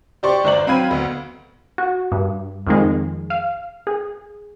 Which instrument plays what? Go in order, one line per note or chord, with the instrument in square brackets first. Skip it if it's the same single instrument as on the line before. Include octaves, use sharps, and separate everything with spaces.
[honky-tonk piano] G4 C5 D5 C6 C#6
G1 D4 C5 D5 A#5 F#7
F#3 C4 F5 B5 G#6 D#7
D2 B3
[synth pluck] F#4
G2
F2 D#3 G#3
F5
G#4